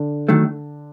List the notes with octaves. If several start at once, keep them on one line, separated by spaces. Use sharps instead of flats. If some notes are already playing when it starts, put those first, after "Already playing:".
Already playing: D3
D#3 F#3 A3